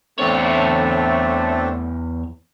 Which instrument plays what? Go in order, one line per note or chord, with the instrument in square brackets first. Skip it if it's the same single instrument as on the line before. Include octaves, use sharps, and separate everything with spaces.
[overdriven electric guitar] E2 C#5 [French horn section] A2 D3 A3 [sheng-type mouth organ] C4 D4 A4